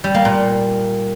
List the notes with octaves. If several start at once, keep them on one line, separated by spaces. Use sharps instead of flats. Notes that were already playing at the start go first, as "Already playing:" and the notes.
G3
A#3
A#2